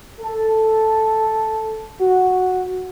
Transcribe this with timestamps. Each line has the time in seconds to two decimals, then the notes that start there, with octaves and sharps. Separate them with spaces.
0.21 A4
2.00 F#4